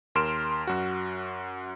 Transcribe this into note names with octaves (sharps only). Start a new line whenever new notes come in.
D#2 A#4 C6 F6 D7 E7
F#2 F#4